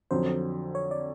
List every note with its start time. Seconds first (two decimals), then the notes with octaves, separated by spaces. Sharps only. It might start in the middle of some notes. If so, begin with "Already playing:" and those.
0.11 F2 D3 F#3 C5
0.75 C#5
0.91 D5